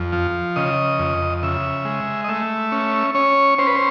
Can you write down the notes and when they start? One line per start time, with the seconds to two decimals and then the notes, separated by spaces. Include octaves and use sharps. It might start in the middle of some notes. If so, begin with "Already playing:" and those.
Already playing: F2
0.12 F3
0.56 C#3 D#5
0.99 F2
1.43 C#3 E5
1.85 G#3
2.24 D#5
2.29 A3 E5
2.72 C#4
3.15 C#4 C#5
3.58 C#4 C5
3.67 B4
3.75 C5